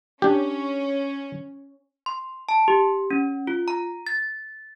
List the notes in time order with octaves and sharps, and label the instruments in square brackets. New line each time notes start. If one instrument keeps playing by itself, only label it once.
[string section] C#4 [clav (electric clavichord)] D4 G4
[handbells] C6
A5
G4
C#4
F4
A#5
A6